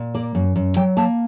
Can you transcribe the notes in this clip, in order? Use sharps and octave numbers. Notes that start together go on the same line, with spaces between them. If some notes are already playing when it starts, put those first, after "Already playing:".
Already playing: A#2
A#3 D5
F#2
F#2
F#3 G5
A#3 A5